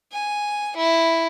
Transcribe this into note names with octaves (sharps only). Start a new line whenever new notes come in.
G#5
E4